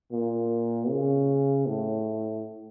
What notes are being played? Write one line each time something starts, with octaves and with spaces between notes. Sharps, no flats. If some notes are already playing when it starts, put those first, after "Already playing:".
A#2
C#3
A2